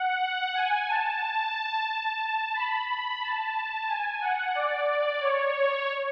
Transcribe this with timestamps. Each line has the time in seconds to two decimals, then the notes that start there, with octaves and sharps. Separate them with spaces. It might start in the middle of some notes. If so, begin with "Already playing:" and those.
Already playing: F#5
0.55 G#5
0.88 A5
2.55 B5
2.88 B5
3.22 A5
3.89 G#5
4.21 F#5
4.55 D5
4.88 D5
5.21 C#5